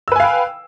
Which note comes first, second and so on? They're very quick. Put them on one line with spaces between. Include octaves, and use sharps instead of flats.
E6 B4 G#5 F5 G5